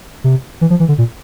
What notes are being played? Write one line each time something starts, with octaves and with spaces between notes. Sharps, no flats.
C3
E3
F3
E3
D3
A#2